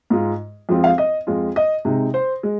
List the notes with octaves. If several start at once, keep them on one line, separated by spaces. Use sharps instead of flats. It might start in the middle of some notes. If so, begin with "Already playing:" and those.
G#2 G#3 F4
F2 F3 G#3 C4 F4
F5
D#5
F2 F3 G#3 F4
D#5
C3 G#3 D#4
C5
G#3